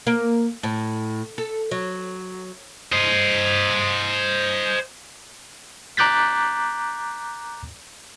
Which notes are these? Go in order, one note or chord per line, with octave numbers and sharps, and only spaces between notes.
A#3
A2
A4
F#3
C5 D#5
A#5 D6 F#6 G6 A6 B6